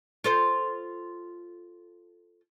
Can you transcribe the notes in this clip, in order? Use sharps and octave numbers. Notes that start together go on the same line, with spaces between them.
F4 A4 C5